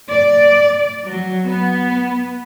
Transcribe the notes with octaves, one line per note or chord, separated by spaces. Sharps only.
D5
F#3
B3